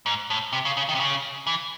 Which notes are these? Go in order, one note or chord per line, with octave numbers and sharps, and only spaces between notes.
G#2
A2
C3
C#3
C#3
D#3
C3
C#3
E3